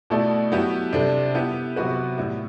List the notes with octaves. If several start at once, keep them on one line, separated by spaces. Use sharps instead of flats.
B2 A3 E4 A4 D5
F#3 B3 E4 G4
C3 G3 D4 A4
B3 E4 G4
C3 F#3 B3 F#4 B4
A2 G3 B3 E4